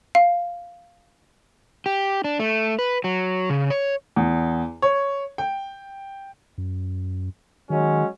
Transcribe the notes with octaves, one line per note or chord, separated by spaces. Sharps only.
F5
G4
D4
A3
B4
F#3
C#3
C#5
E2
C#5
G5
F#2
D#3 F#3 G#3 C#4